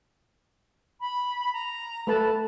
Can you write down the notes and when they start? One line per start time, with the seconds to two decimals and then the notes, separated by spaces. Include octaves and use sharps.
1.01 B5
1.53 A#5
2.07 A3 B4 A5 B5